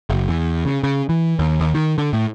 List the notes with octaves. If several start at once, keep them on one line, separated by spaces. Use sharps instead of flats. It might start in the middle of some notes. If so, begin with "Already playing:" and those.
F#1
E2
C#3
C#3
E3
D#2
D#2
D#3
D3
A2